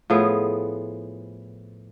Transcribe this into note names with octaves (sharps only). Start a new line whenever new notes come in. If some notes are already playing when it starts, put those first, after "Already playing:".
A2 F3 B3 G#4